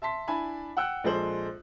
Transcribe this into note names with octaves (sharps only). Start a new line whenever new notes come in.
E5 A5 C6 B6
D4 E4 E5 G#5 A5 B5
F#5 G5 E6 F#6
A#1 G#3 A4 C5 F#7